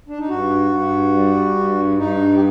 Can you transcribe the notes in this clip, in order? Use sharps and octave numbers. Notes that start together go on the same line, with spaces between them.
D4
D#4
G2 F#4
G2
G3
G2
G2 D#4
G4